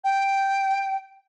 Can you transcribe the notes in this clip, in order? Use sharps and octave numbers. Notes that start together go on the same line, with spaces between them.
G5